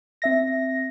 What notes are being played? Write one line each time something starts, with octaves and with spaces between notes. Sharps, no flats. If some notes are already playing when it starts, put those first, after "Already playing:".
C4 E5 A#6